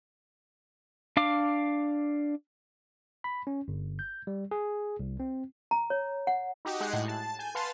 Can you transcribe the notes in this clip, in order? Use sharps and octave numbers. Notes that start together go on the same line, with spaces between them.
D4 F5 D6
B5
C#4
G1
G6
G3
G#4
C2
C4
A#5
C#5
F#5
D#4 F#4 G4
G#3 D#5 F#5 F#6 G#6 C7
A2
A5
G#5 G6
B4 F5 F#5 A5 C6 A6